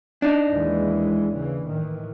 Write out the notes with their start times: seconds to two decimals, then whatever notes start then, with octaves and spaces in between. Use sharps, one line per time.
0.22 D4 D#4
0.51 D#2 E3 G#3
1.35 C#3 E3
1.67 A2 D#3 E3